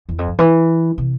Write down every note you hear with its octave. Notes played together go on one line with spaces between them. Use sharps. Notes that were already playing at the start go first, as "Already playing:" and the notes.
E2
F2
G2
E3
C3